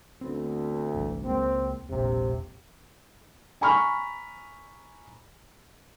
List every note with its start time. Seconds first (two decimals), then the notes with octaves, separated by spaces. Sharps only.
0.21 D2 B3 C4
0.94 G1 C2 E3
1.25 C#2 G#3 A#3 C4
1.89 E1 A#1 C3
3.61 G#5 A#5 B5 C#6 F6